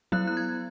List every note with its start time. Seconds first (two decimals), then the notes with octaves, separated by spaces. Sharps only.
0.12 F#3 B3 E4 F#6
0.27 F#6
0.37 G#6